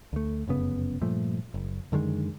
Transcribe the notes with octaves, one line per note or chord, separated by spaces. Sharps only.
D2 A3
F1 F#2 C#3 B3
G2 A#2 F3 A3
F#1
F#2 D3 D#3 G#3